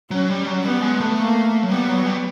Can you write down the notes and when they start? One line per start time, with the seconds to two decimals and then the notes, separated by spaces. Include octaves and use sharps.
0.11 F#3 C#4
0.30 G3
0.47 F#3
0.64 G3 B3
0.82 G#3
1.00 A3
1.18 A#3
1.63 F#3
1.70 G3 B3
1.89 F#3
2.06 G3